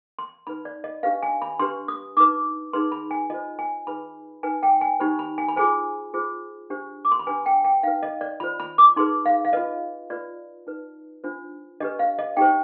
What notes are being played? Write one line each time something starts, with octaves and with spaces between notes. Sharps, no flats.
C6
D#4 B4 B5
D5
D#5
D4 G4 B4 F5
G#5
B5
D4 G4 B4 C6
D#6
D#4 B4 D6
D#4 G#4 B4 C6
B5
G#5
F4 C5 D#5
G#5
D#4 G#4 B4 B5
D#4 B4 G#5
G5
G#5
D#4 G4 C5 B5
B5
G#5
B5
F4 G#4 C5 G#5
F4 G#4 C5
D4 G4 C5
D6
C6
B5
D4 G4 B4 G#5
G5
G5
D#4 B4 F5
D#5
D5
F4 C5 B5
B5
D6
D#4 G#4 B4 C6
F5
F5
F4 B4 D#5
F4 B4 D5
D#4 B4
D4 F4 C5
D4 G4 B4 D#5
F5
D#5
D#4 G4 C5 G5